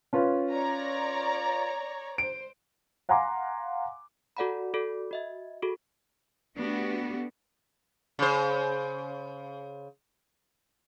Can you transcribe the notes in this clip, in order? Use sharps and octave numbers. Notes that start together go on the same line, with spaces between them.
C#4 F4 B4
C#5 D5 A#5
C5 D7
F5 F#5 G#5 A#5 C6 D6
F#4 A4 D5 F#5 A#5 B5
F#4 A4 D5
F#4 D#5 E5
F#4 G#4 A4
A3 B3 D4 F#4 G4
C#3 C5